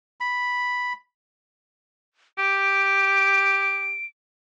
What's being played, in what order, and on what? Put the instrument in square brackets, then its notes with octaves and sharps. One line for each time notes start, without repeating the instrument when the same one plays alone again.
[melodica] B5
[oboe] G4 [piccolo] D7